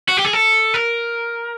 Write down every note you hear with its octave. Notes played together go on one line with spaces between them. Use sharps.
F#4
G4
G#4
A4
A#4